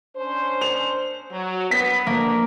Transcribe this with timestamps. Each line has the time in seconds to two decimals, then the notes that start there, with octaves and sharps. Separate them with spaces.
0.17 C#4 D4 C5
0.61 F7
1.31 F#3
1.71 B3 B6
2.07 D2 A#3